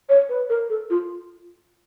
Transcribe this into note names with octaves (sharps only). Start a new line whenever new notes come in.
C#5
B4
A#4
A4
F4